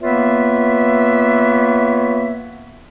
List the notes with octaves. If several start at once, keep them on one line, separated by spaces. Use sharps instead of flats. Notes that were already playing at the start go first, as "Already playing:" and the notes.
A#3 B3 F4 B4 C#5 E5